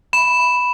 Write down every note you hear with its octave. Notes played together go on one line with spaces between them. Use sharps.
B5 E7
B5